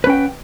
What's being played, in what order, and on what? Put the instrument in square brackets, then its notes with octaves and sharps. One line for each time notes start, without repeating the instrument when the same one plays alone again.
[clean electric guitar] B4
C#4
G5
F#5